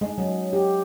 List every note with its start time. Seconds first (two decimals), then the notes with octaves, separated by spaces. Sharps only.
0.01 G#3
0.18 F#3
0.53 G4